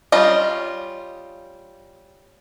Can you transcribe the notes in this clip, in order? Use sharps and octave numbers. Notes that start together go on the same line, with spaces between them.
G3 C#4 F4 D#5